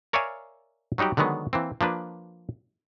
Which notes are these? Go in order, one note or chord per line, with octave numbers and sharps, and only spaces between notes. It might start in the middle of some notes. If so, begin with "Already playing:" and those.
A#4 C#5 D5 E5 F5 G#5
F#3 G3 D#4 F#4 G4
D3 D#3 F#3 G#3 B3
E3 A#3 C4
F3 A#3 D4 B4